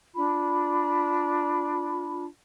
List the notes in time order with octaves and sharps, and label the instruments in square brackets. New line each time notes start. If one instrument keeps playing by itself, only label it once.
[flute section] D4 F4 B5